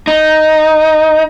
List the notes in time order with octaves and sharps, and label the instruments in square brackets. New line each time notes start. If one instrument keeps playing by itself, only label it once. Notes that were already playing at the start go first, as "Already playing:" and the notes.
[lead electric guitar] D#4